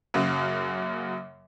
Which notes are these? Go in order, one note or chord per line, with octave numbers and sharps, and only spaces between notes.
F#2 C#3 F#3 A#3